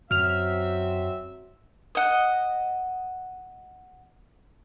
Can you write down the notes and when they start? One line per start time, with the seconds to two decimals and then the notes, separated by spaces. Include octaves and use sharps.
0.11 F#2 F#3 C4 E5 F6 F7
1.95 D#5 F#5